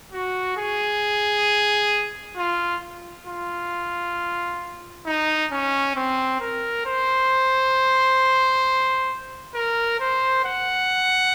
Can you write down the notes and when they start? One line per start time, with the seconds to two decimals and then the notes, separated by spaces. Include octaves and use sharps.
0.12 F#4
0.57 G#4
2.37 F4
3.27 F4
5.06 D#4
5.52 C#4
5.96 C4
6.40 A#4
6.86 C5
9.54 A#4
10.00 C5
10.45 F#5